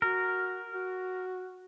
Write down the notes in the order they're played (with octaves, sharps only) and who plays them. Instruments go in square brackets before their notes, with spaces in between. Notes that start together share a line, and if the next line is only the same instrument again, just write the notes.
[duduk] F#4 [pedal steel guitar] A#4
[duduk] F#4